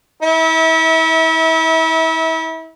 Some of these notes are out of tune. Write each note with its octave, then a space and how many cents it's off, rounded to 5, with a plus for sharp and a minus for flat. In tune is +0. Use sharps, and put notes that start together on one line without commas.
E4 -35 E5 -25